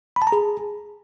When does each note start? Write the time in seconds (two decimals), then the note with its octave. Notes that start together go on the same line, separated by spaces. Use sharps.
0.16 B5
0.22 A5
0.27 A#5
0.32 G#4